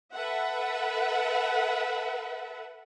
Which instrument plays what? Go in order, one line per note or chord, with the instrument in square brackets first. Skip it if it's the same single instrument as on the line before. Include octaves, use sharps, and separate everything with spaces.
[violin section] A4 B4 E5 F#5